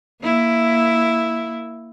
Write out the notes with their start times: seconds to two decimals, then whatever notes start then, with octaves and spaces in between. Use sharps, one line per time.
0.22 A#3 E4